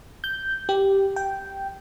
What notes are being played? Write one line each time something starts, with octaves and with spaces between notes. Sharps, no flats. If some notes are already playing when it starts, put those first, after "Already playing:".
G6
G4
G5